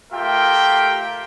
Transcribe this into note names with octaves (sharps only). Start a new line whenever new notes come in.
A3 F4 G4 A#4 E5 G5